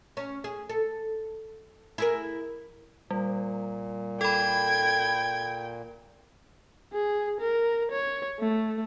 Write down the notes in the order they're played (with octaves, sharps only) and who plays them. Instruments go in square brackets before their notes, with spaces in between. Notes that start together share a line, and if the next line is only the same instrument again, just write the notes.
[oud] C#4
G#4
A4
E4 G#4 A#4
[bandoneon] A#2 [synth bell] G3
[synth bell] A4 B5 [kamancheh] G5 [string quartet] G#6
[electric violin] G#4
A#4
C#5
A3